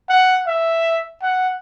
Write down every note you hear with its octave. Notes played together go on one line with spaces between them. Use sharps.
F#5
E5
F#5